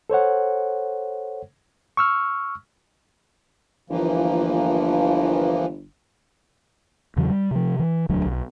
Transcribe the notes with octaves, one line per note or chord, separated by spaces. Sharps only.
A4 C5 C#5 F#5
C#6 E6 F6
G1 E3 F3 A#3
E2 C#3 E3 F#3
G3
C3 F3
E3
E1 D2 F#3 D4
B1